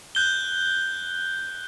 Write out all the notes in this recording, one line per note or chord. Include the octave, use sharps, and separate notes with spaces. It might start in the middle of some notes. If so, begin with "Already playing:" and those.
F#6 G6 G7